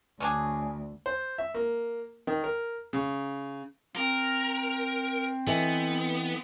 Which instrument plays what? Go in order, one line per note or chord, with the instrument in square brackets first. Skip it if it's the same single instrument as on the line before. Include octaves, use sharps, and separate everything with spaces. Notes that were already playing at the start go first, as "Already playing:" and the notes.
[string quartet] D2 [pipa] C#4 D4 G#4
[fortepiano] C5
E5
A#3
D#3
A#4
C#3
[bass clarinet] C4 [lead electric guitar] A#4
[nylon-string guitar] E3 A4 D#5 [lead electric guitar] B3